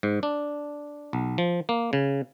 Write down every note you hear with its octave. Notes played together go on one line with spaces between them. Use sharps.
G#2
D4
B1
F3
A#3
C#3